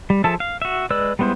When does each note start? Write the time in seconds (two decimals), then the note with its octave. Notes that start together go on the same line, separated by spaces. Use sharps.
0.10 G3
0.24 F3 G#4 A4 E5 A5
0.40 F5
0.62 F#4 E5
0.90 G#3 B4 D5 E6
1.19 G3 G#3 B3 E4 C5